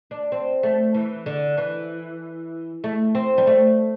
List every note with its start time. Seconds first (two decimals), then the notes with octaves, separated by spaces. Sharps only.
0.11 D4
0.32 C4
0.63 A3
0.94 E3
1.26 D3
1.58 E3
2.84 A3
3.15 C4
3.38 G3
3.47 A3